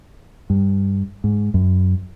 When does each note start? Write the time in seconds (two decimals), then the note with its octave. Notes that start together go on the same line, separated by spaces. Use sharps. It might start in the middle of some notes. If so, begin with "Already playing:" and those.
0.50 G2
1.24 G#2
1.54 F#2